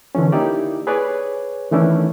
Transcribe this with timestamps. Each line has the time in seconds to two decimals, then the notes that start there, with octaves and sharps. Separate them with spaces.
0.15 D3 E3 F3 C#4
0.32 A#3 D#4 E4 G4 D5
0.87 G#4 B4 C#5 D5 G#5
1.71 D#3 E3 A3 C#4 D4 E4